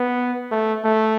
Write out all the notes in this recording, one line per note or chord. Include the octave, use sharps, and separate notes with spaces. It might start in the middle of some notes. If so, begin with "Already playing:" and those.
Already playing: B3
A3
A3